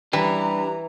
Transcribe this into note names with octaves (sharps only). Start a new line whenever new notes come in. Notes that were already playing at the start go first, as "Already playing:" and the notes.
E3 G3 D4 G4 B4 A#5